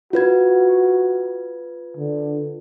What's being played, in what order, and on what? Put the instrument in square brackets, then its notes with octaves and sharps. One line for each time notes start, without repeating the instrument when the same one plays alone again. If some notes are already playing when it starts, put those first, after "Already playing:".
[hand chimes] F4 B4 G#6 [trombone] F#4
[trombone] D3